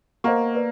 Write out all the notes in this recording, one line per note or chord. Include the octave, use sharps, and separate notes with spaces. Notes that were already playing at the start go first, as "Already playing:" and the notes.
A#3 C5 D#5 F#5 A#5 C#6
B4 D5